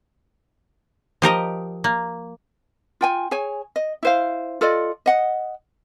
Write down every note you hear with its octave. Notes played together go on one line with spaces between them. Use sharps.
F3 G4 A#4 D#5
A#3
F4 G5 G#5
G#4 C#5 G#5
D#5
E4 C5 F5
F4 A4 D5 D#5
D#5 F#5